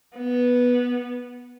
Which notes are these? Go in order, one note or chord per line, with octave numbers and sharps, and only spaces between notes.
B3